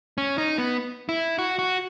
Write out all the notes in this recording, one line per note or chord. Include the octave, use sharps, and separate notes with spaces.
C#4
D#4
B3
E4
F#4
F#4